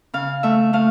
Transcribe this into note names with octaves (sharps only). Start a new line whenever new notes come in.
C#3 F5
A3 E5
A3 F5